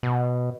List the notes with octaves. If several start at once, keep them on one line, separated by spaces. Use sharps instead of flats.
B2